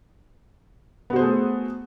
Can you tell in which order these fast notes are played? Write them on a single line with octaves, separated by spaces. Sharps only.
B3 F#4 C5 G#4 A3